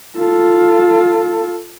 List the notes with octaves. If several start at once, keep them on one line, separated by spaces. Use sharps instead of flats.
F4 A4